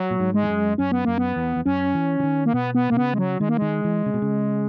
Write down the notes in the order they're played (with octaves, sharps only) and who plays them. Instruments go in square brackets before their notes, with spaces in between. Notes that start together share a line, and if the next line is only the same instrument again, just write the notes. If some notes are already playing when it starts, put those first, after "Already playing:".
Already playing: [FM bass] F#3
[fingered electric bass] A#2
G#2
[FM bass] G#3
[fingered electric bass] E2
F#2
[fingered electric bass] F#2 [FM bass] C#4
[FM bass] B3
[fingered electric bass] F#2 [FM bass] A#3
[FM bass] B3
[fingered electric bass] E2
E2
[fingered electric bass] F#2 [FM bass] C#4
[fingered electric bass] E3
E3
D#3
[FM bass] A#3
[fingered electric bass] B2 [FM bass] B3
[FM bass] B3
[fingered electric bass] B2 [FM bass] A#3
[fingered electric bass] C#3 [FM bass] B3
[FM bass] G#3
F#3
[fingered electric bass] D#3 [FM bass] G#3
[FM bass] A#3
[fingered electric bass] D#3 [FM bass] G#3
[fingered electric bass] E3
C#3
B2
C#3